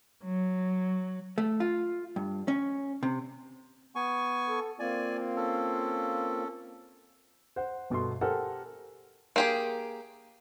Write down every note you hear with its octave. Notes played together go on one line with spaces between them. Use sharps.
F#3
A3
F4
G2
C#4
C3
B3 G#5 C#6
A4
A#3 C4 F4 D5 G#5
C#4 A4
C5 F#5
G1 B2 A4 C6
G4 A4 A#4 C5 F#5 G#5
A#3 G4 G#4